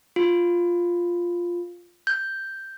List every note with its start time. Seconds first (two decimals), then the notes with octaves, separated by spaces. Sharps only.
0.16 F4
2.07 G6